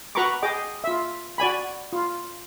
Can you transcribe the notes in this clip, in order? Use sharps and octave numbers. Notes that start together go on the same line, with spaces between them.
F#4 B4 A#5 B5 C#6 D6
G#4 D#5 G5 D6
F4 E5
F#4 D5 G#5 B5
F4